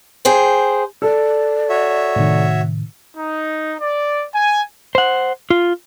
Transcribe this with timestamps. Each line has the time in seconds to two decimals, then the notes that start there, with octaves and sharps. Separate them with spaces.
0.25 G#4 C5 G5
1.02 A4 D5
1.69 F#4 C#5 E5
2.16 A2 C3 D#3
3.16 D#4
3.80 D5
4.32 G#5
4.95 C5 F#5
5.50 F4